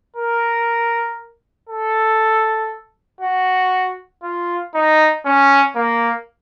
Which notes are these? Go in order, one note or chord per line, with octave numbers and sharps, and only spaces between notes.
A#4
A4
F#4
F4
D#4
C#4
A#3